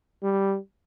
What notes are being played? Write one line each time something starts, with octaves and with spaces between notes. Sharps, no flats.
G3